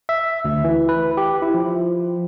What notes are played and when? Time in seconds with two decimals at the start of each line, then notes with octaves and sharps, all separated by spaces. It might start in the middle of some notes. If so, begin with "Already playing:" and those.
0.09 E5
0.45 D2
0.64 E3
0.89 B4
1.17 G4
1.42 E4
1.54 F3